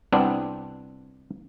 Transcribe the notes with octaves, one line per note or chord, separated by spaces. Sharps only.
C2 B3 C4 D4